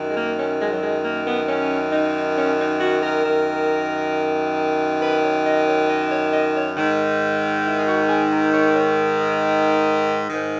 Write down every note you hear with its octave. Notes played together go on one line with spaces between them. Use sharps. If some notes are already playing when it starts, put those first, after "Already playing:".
Already playing: F#2 D#3
G#3
A#3
C#4
G#3
F#3
G#3
A#3
B3
C#4
D#4
C#4
D#4
F#4
A#4
F#2 D#3
B4
C#5
D#5
C#5
D#5
C#5
D#5
C#5
G#2 D#3
E4
G#4
F#4
G#4
A#4
C#5
C#5
D#5
G#2 D#3